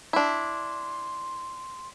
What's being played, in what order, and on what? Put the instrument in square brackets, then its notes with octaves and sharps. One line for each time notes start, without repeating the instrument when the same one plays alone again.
[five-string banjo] D4 E4 [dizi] C6